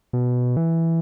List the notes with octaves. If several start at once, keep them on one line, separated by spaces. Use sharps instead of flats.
B2
E3